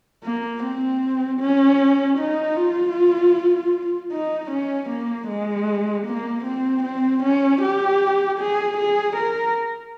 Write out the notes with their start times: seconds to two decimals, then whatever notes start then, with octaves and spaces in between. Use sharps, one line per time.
0.24 A#3
0.63 C4
1.40 C#4
2.18 D#4
2.56 F4
4.12 D#4
4.51 C#4
4.90 A#3
5.28 G#3
6.06 A#3
6.45 C4
6.84 C4
7.23 C#4
7.62 G4
8.39 G#4
8.78 G#4
9.17 A#4